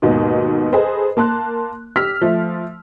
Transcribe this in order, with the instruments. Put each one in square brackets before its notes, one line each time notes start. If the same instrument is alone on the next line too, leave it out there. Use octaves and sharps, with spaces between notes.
[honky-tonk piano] D#2 G#2 B2
G#4 A4 B4 C5 D#5
A#3 A5 C6 F#6
G4 E6 F6 B6
F3 A3